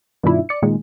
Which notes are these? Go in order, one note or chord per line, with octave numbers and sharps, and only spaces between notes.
G2 B2 D#3 D4 E4 F4
D5 C#7
A#2 D#3 G#3